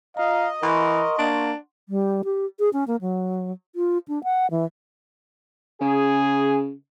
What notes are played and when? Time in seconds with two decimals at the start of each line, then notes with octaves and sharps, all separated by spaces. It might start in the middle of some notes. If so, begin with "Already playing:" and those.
0.17 F4 D#5 F5 A#5
0.63 E3 A#4 F#5 C6 C#6
1.19 A#3 D4
1.89 G3
2.25 G4
2.59 G#4
2.73 C#4
2.88 A#3
3.01 F#3
3.76 F4
4.08 D4
4.24 F#5
4.51 E3
5.81 C#3 G#4